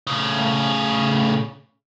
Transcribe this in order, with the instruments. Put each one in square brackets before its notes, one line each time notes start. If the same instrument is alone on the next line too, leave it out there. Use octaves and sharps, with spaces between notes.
[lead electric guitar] A2 C#3